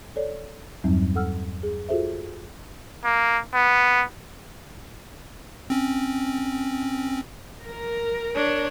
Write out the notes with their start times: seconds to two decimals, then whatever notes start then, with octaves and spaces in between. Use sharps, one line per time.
0.16 A4 C#5 D5
0.84 E2 G2 F#3 G3 C4 D#4
1.15 A4 F#5 E6 F6
1.63 G#4
1.89 F4 F#4 G#4 A4 C5 E5
3.04 A#3
3.54 B3
5.70 C4 C#4
7.62 A#4
8.35 D4 C#5